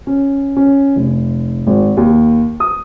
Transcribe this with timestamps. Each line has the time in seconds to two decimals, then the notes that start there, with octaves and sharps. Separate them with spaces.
0.07 C#4
0.56 C#4
0.96 F1
1.67 G#1
1.97 D#2
2.60 D#6